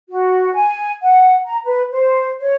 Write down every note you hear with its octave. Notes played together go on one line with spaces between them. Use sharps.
F#4
G#5
F#5
A#5
B4
C5
C#5